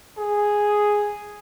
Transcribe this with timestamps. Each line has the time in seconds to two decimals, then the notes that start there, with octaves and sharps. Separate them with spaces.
0.18 G#4